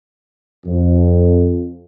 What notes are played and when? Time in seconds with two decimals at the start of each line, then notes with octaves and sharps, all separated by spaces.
0.67 F2